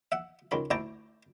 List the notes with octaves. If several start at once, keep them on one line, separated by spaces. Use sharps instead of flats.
E5 F#5
C#2 D#3 B5
D2 E4 D5 G5 A5 A#5